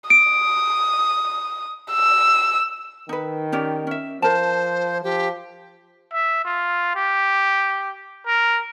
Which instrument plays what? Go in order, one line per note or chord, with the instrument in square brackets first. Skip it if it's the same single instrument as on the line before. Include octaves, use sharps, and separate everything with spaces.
[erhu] D#6 [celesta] D7
[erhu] E6
[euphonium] D#3 [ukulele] D#4 B4
[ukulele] C#4 G4 D5
C#4 E5
[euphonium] F3 [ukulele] A#4 A5 [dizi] C5
[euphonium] F3 [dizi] G4
[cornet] E5
F4
G4
A#4